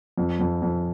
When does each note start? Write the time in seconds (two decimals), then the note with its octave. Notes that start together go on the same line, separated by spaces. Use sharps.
0.18 F2
0.40 F2
0.62 F2